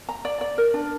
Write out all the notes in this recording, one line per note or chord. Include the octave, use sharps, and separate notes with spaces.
A#5
D5
D5
A#4
D4